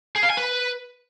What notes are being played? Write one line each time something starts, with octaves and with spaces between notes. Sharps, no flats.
G#4
F5
G#5
B4